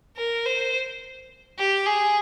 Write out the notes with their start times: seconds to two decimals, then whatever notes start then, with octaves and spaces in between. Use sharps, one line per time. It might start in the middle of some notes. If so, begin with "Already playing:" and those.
0.17 A#4
0.46 C5
1.58 G4
1.86 G#4